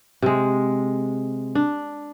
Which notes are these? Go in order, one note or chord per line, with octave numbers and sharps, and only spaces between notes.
C3 G#3
D4